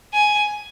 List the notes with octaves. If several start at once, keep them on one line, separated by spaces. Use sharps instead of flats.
G#5